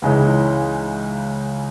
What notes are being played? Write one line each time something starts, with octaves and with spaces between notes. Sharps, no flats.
C#2 C#3 E3 G#3 D#4